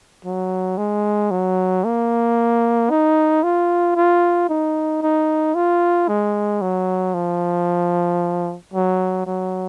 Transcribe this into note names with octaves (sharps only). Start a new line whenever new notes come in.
F#3
G#3
F#3
A#3
D#4
F4
F4
D#4
D#4
F4
G#3
F#3
F3
F#3
F#3